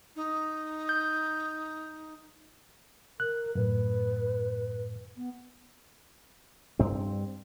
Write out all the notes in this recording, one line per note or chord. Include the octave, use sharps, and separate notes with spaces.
D#4
G6
A#4 F#6
F#2 A2 B4
B3
G2 C4